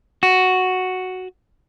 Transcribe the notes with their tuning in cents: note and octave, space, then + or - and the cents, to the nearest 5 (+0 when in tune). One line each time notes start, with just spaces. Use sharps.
F#4 +0